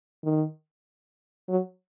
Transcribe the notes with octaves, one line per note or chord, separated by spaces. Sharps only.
D#3
F#3